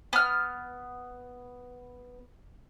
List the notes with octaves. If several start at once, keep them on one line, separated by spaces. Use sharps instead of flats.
B3 F6